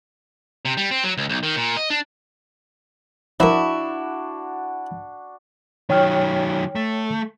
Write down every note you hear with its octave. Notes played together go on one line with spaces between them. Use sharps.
C3
G3
C4
F#3
C#2
B1
D#3
A#2
D#5
D4
F3 D4 E4 F#4 A#4
D#3 F#3 C#5 G5 F6
A3